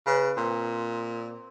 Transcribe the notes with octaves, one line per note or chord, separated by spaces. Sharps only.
C#3 B4
A#2 C4